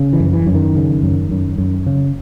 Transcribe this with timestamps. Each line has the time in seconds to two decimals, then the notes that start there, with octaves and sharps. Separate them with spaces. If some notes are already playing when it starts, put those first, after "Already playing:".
Already playing: C#3
0.13 E3
0.20 F#2
0.33 E3
0.47 F#2
0.55 D#3
0.75 C#3
1.02 F#2
1.31 F#2
1.58 F#2
1.87 C#3